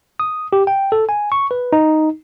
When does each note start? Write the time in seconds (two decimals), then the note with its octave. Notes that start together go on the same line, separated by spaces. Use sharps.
0.20 D#6
0.53 G4
0.67 G5
0.92 A4
1.09 G#5
1.32 C#6
1.51 B4
1.73 D#4